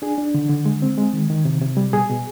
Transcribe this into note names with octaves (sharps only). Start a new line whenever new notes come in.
D4 G#4
D4
D3
D3
G#3
C4
G#3
D#3
D#3
C3
C3
G3
B2 G#4
B2